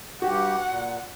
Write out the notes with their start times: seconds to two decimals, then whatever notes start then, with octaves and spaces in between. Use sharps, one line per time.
0.22 G2 F#4 G4 F#5
0.68 A#2